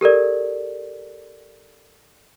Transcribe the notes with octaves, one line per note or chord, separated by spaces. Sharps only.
G4 A4 A#4 D5